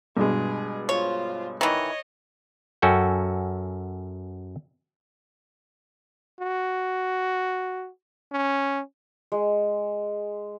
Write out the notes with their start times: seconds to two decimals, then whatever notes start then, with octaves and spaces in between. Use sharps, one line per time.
0.17 G2 B2 G#3 G#4
0.89 F4 C5 C#5
1.61 D#3 E3 C#5 D#5
2.82 F#2 C#4 F#4 A4 G5
6.40 F#4
8.32 C#4
9.32 G#3